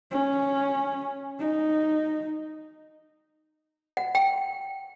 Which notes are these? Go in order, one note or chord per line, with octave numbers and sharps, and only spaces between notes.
C#4
D#4
F#5
G5